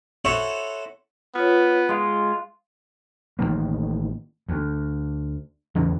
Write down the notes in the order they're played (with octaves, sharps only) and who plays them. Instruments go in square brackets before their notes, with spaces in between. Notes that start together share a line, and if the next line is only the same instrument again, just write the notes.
[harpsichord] E4 F#4 A4 C5 C#5 F#5
[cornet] B3 [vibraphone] F4 B4 C#5
[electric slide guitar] G#3 F4 [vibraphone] F5 C6
[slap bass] A1 D3 D#3 A#3
D2
E2 C#3 E3